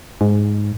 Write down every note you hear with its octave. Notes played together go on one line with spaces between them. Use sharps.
G#2